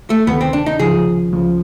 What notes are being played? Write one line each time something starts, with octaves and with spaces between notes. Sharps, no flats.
A3
D2 C3 D#3 B3
C4
D4
D#4
C#2 C#3 F3 G#4
C#2 C#3 F3